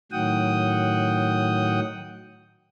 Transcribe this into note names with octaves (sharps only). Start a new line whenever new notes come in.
A2 D#3 F#3 F#5 G5 D#6